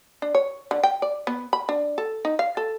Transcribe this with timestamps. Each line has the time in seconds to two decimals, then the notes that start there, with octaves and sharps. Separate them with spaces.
0.22 D4
0.35 C#5
0.71 D3
0.83 G5
1.02 D5
1.27 B3
1.53 B5
1.69 D4
1.98 A4
2.25 D#4
2.39 F5
2.57 A4